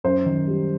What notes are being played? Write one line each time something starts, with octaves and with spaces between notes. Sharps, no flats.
F#2 C5
D#3
G3